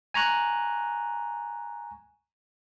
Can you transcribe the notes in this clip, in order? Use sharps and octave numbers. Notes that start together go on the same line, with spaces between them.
G#5 A#5 C#6 F#6